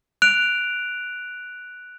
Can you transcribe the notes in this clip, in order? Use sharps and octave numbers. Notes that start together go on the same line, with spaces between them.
F#6 D7 F7